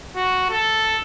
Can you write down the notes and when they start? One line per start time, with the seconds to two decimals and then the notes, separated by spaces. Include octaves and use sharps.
0.16 F#4
0.50 A4